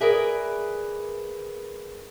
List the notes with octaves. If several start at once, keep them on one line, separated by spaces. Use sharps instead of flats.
G#4 A#4 B4 D5 E5 G#5